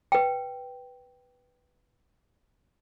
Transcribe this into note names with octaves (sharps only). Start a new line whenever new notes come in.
B4 G5